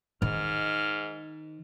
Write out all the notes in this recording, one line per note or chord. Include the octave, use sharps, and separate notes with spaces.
G#2 D#3 F6